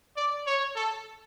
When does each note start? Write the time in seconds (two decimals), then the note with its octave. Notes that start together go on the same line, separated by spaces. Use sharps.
0.16 D5
0.47 C#5
0.76 A4